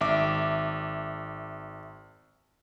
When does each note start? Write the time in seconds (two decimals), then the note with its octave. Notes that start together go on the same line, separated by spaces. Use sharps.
0.01 G#1 E5 D6